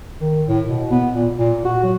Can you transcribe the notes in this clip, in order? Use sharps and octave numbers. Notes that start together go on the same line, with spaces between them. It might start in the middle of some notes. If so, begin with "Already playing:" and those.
D#3
A2
B2
B3
A#2
A#2
F#4
F#3